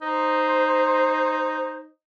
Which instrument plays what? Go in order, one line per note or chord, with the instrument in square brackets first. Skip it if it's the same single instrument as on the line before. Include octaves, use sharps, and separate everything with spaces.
[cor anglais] D#4 [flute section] C5